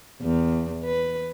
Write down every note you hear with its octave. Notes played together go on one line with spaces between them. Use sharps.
E2
B4